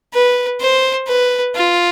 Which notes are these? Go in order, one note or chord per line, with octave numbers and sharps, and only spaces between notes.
B4
C5
B4
F4